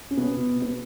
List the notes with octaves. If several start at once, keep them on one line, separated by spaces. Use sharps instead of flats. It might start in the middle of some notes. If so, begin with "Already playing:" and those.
C#4
B2 B3
B2
B2
B3